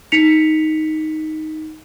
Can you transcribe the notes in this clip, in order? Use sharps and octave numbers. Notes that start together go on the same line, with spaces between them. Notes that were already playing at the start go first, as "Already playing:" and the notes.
D#4 B6 C#7 F7